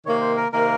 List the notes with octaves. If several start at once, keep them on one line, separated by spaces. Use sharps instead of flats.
C3 D#3 A#3 C#5
C5
A#4
C3 D#3 A#3 A#4